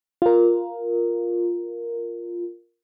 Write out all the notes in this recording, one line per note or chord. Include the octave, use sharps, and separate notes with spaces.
F4 A#4